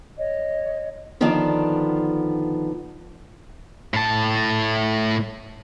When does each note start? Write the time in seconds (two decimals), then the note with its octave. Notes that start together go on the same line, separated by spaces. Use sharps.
0.17 C#5 D#5
1.21 D3 D#3 F3 B3 D4 F4
3.94 A2 A5